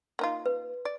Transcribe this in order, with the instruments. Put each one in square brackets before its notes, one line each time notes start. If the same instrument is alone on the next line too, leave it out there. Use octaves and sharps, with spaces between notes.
[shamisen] A#3 D#4 F4
[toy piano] B4
[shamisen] D5